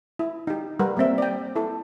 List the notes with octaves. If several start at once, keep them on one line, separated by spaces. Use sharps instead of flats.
E4
D#4 G4
G3 A#4 B4 F#5
G3 A#3 C4 E5
D5 G5
E4 A4